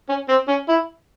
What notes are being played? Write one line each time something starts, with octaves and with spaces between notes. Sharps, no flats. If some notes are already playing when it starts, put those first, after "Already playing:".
C#4
C4
C#4
E4